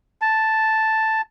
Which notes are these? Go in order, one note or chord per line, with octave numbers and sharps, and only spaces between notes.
A5